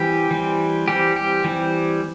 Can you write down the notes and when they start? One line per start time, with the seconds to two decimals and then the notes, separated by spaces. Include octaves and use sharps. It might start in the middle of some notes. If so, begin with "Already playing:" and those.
Already playing: E3 G3 C4 G4
0.31 E3 G3 C4
0.88 E3 G3 C4 G4
1.16 G4
1.44 E3 G3 C4